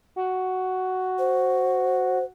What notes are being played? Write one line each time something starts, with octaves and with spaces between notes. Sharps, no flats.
F#4
C5